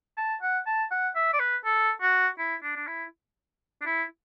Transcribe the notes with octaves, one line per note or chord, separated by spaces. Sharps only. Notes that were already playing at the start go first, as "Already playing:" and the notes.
A5
F#5
A5
F#5
E5
D5
B4
A4
F#4
E4
D4
D4
E4
D4
E4